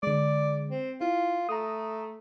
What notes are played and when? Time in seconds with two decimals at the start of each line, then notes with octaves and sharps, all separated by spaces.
0.03 D3 G#3 D5
0.71 C4
1.01 E4 F4
1.49 A3 A#5 D#6